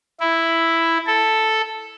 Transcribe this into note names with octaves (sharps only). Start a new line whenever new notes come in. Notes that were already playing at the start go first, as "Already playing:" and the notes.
E4
A4